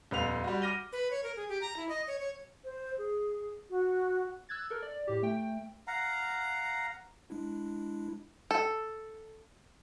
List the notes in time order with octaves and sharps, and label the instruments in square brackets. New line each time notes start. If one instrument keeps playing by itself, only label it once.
[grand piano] D#1 F2 B3 F5 F7
G3 F#4
D6 F6 A#6 D#7 G7
[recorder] B4
C#5
A#4
G#4
G4
A#5
E4
D#5
C#5
C#5
[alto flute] C5
G#4
F#4
[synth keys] E6 F#6 G#6 A6
A4 A#4
D5
A2 G4
A3 G5
[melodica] F5 F#5 A#5
[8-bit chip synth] G#3 D4 E4
[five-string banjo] A4